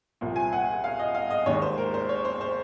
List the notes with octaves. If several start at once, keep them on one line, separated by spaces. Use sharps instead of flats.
C2 A#2 F3
G#5
F#5
F5
D#5
F5
D#5
D#2 D#3 G#3 C#5
C5
A#4
C5
C#5
C5
C5